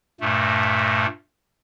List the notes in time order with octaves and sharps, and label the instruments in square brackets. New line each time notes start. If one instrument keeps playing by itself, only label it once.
[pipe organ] G2 A#2 A3